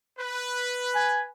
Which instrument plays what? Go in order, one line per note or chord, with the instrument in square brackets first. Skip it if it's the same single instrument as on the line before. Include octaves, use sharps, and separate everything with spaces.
[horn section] B4
[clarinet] G#5